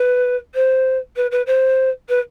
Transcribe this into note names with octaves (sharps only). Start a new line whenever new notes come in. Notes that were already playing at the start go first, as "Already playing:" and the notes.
Already playing: B4
C5
B4
B4
C5
B4